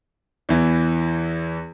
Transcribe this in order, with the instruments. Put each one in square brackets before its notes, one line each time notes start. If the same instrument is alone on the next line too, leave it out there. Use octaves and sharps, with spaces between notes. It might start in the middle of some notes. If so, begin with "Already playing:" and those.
[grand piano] E2 E3